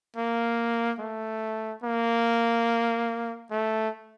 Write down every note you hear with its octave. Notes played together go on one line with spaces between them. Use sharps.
A#3
A3
A#3
A3